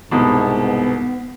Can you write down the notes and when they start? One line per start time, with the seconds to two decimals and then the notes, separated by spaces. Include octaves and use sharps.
0.11 C2 G#2 B2 B3